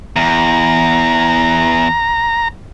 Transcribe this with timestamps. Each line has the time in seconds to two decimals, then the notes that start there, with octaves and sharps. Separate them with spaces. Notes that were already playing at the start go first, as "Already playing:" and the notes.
0.16 E2 A#5